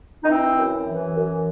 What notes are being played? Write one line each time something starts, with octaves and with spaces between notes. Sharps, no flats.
D#4
E3 C4
F#2
E3
F#2